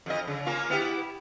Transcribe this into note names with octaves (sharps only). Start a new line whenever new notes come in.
F2 D#5
C#3
A#3 C#4 F4
B3 E4 G4